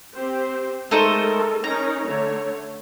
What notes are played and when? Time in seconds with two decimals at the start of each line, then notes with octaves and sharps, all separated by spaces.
0.14 C4 G4 C5
0.91 G#3 A3 D#4 A4 A#4 C5
1.64 C#4 D#4 A#4 A#5
2.06 D3 A3 C#5